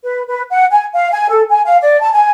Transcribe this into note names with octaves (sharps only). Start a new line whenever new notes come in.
B4
B4
F#5
G#5
F5
G#5
A4
G#5
F5
D5
A5
G#5